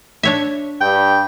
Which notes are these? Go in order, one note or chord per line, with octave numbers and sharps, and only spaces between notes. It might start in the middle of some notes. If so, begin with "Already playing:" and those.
D4 C#5 E5
G2 G5